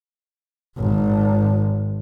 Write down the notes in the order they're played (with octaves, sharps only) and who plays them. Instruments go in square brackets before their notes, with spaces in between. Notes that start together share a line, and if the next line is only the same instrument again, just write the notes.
[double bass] G#1